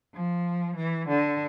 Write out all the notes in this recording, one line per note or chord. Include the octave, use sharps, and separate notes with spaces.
F3
E3
D3